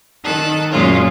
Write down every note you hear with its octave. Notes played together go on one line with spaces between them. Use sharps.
D#3 A4 F#6
F#2 A#2 F#3 G#3 C#4 F4